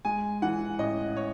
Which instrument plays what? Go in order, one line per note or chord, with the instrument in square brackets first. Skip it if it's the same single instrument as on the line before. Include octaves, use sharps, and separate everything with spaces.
[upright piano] G#3 [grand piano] G#5
[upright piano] E3 [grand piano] F#5
[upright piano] A1 [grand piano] D#5
[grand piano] C#5